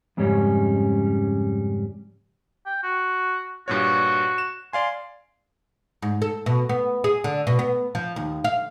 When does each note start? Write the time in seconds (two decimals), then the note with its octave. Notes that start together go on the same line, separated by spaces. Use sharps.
0.17 F2 G#2 C#3 G3 C#4
2.66 G5
2.83 F#4
3.68 G2 A#2 F#4 C#5
4.38 E7
4.73 D5 F5 G#5 C6
6.02 G#2
6.22 A4
6.46 B2
6.69 B3
7.04 G#4
7.24 D3
7.47 B2
7.59 B3
7.95 F3
8.16 D#2
8.44 F5